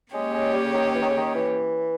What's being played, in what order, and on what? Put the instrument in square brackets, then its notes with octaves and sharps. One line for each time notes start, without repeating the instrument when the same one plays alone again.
[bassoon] G#3 [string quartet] A#3 C#4 G4 C#5
[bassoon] G#3
G3
C#3
D#3
E3
D#3
C#3
D#3
E3